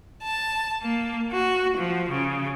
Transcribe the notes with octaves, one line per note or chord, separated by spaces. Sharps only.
A5
A#3
F#4
F3
C#3